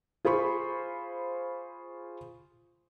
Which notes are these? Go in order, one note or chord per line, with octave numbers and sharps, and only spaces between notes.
F4 G#4 C5 B5 C#6